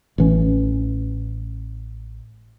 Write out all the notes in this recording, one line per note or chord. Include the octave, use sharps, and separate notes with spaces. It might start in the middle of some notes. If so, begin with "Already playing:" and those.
A1 E3 C#4